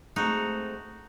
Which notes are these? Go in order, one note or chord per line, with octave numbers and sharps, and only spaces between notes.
G#3 A3 C4 D#4 F#4